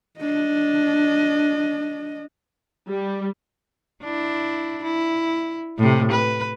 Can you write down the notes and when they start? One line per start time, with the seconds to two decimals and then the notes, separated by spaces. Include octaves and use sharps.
0.20 D4 D#5
2.90 G3
4.03 D4 E4
4.84 E4
5.78 A2 C3
6.12 B4